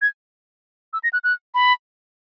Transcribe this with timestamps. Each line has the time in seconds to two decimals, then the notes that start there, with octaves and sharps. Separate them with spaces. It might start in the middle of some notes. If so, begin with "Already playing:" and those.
0.02 G#6
0.93 E6
1.03 A#6
1.13 F#6
1.24 F#6
1.54 B5